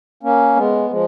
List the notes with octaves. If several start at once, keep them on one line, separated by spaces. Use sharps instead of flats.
A#3 C#4
G#3 B3
F3 G#3